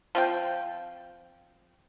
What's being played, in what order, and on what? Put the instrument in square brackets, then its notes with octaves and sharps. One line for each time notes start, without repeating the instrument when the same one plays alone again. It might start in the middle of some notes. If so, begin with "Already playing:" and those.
[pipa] F3 C4 G5